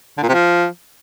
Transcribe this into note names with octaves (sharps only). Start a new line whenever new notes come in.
D3
A#2
C3
F3